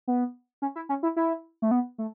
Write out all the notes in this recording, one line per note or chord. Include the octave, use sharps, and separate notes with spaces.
B3
C#4
E4
C#4
E4
E4
A3
B3
A3